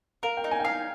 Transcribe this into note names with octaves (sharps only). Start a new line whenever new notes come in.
A#4 F5
G5
D#4
G#5
G5
F5 G#5